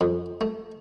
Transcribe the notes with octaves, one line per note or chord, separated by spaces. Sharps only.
F2
A3